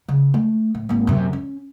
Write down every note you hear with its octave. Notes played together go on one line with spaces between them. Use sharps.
C#3
A3
A2
G#1 A#3
F#2 C3
C#4